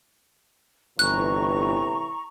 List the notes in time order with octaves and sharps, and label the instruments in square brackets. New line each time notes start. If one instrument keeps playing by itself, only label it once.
[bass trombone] G1 [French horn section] A2 C3 E3 [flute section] A#5 C#6 [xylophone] F#6